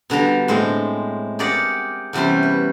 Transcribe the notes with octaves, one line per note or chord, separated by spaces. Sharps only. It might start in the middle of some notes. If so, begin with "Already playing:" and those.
B2 D3 G3 A#5
A2 G#3 C4
G4 G#4 A#4 D5 F5 F#5
E2 C3 G3 C#4 C6
B4